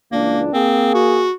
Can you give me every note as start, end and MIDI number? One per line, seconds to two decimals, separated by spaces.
0.12 0.51 37
0.12 0.51 52
0.12 0.41 58
0.12 0.51 62
0.54 1.27 58
0.54 0.92 60
0.54 1.27 68
0.94 1.32 66